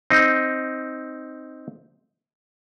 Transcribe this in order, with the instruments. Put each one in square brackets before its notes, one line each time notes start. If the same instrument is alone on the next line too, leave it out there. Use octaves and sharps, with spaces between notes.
[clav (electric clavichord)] C4 D#4